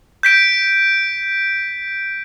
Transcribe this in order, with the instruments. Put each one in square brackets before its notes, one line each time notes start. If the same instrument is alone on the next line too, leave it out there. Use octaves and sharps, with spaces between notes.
[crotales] G6 B6 D7